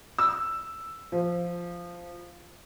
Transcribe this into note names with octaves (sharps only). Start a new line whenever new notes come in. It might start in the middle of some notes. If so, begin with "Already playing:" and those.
E6
F3